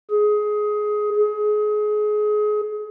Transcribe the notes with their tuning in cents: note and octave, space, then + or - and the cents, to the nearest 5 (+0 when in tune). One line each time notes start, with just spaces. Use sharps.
G#4 +15
G#4 +25